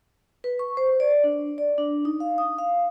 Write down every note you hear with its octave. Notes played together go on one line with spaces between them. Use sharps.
B4
C#6
C5
D5
D4
D5
D4
D#4
F5
D#6
F5